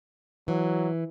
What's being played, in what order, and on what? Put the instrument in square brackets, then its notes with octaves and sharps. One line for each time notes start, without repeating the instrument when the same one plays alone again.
[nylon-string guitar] E3 [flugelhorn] F#3